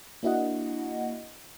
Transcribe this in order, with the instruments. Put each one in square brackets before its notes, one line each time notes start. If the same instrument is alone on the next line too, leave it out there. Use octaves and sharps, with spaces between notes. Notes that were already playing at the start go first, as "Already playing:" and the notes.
[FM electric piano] A#3 D4 E4 F#4 D#5 F#5